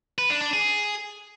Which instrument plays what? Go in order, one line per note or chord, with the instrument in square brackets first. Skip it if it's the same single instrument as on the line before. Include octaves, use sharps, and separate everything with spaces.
[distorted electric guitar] B4
D4
D4
G#4